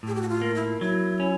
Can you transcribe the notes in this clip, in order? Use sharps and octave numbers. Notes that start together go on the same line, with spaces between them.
A2 G#4
G4
F#4
F4
A#3
E4
F#3 E4
C#4